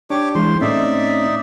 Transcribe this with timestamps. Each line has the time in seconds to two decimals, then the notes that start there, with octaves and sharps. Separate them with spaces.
0.10 D4 G4 C#5 D6
0.35 E3 G#3 C5 C6
0.61 A2 A3 C4 C#4 D#4 D5 E5